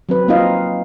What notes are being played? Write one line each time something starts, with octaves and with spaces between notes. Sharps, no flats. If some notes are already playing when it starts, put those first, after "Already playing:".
F#3 C4 B4
A#3 C4 D#4 F4 D#5 F5